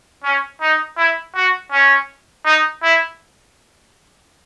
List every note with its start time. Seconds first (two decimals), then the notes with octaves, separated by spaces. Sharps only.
0.24 C#4
0.61 D#4
0.98 E4
1.36 F#4
1.72 C#4
2.45 D#4
2.83 E4